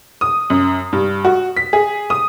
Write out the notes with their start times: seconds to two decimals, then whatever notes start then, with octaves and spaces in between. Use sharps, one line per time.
0.21 D#6
0.50 F#2
0.93 G2
1.25 F#4
1.57 B6
1.73 G#4
2.10 D#6